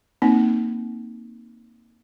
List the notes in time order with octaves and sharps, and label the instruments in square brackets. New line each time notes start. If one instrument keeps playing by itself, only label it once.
[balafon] A#3 C4 D#4